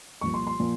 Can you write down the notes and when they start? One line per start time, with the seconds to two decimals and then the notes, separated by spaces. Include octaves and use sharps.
0.21 C2 A#2 F3 C#6
0.34 C6
0.47 C6
0.60 A#2 F3